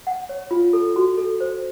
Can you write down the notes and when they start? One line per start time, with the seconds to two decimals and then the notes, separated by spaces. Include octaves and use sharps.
0.07 F#5
0.29 C#5
0.51 F4
0.73 A4
0.96 F#4
1.18 A4
1.40 C5